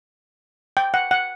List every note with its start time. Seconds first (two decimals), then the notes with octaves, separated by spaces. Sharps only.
0.77 G5
0.94 F#5
1.11 F#5